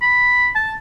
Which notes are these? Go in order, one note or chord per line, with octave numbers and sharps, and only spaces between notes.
B5
A5